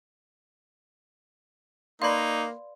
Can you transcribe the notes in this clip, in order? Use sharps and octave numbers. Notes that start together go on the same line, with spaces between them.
A#3 D#4 B4 D5 F5 B5 C6